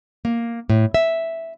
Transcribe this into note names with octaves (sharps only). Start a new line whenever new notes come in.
A#3
A2
E5